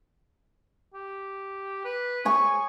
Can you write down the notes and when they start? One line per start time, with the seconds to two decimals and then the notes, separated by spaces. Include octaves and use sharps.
0.94 G4
1.85 B4
2.25 G#4 C#5 G#5 C#6